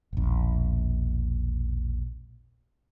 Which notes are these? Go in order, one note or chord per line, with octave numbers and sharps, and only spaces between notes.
E1 A#1